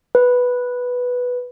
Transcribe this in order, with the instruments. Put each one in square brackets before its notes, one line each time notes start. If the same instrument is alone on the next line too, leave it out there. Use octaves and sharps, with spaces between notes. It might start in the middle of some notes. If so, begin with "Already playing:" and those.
[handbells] B4